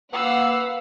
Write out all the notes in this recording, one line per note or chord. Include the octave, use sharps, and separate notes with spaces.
A#3 B4 F5 F#5 E6